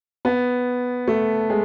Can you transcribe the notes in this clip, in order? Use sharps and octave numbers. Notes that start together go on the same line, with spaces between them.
B3
A3
G#3